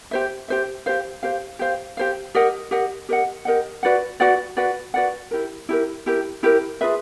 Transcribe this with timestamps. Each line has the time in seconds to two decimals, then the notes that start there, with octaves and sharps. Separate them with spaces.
0.11 G4 C5 E5
0.48 G4 C5 E5
0.86 G4 C5 F5
1.23 G4 C5 F5
1.59 G4 C5 F5
1.97 G4 C5 F5
2.35 G4 A#4 D#5 F#5
2.71 G4 A#4 D#5 F#5
3.09 G4 A#4 D#5 F#5
3.45 G4 A#4 D#5 F#5
3.83 F#4 B4 D5 F#5
4.20 F#4 B4 D5 F#5
4.57 F#4 B4 D5 F#5
4.94 F#4 B4 D5 F#5
5.31 E4 G4 A#4
5.69 E4 G4 A#4
6.06 E4 G4 A#4
6.43 E4 G4 A#4
6.81 F4 G#4 B4 E5